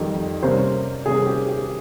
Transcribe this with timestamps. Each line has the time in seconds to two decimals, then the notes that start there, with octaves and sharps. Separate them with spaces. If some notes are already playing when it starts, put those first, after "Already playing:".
Already playing: F2 D#3 G3
0.42 C3 G3 A#3 C#4 C5
1.06 C3 G3 A#3 C#4 G#4
1.26 G4
1.48 G4